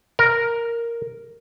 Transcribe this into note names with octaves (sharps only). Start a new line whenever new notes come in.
A#4